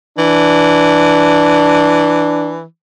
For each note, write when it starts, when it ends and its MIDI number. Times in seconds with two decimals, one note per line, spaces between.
0.18 2.64 52
0.18 2.57 62